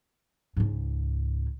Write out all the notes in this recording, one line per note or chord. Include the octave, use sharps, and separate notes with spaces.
C#2 G#2